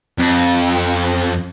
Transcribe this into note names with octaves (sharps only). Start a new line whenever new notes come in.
F2